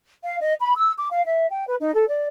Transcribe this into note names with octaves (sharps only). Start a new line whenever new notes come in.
F5
D#5
B5
E6
D6
F5
E5
G5
B4
D#4
A4
D5